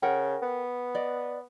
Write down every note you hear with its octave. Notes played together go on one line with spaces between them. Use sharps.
C#3 A#4 F#5 G5
B3
D5 D#5